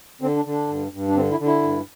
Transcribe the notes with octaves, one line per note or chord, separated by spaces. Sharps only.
D3 C4
D4
D3
D4
G2
G2
D4
D3 C4
E4
D3
E4
G2